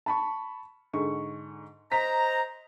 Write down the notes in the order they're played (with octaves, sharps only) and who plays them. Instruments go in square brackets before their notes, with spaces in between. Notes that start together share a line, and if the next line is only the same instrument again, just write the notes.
[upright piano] A5 B5 C#6
G#2 D3 C#6
[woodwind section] C5 D#5 A#5 [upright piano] B6